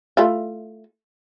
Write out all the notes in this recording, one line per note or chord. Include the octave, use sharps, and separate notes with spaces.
A3 E4 F4